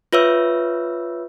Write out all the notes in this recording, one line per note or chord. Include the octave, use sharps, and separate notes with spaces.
F4 B4 C#5 E5 E6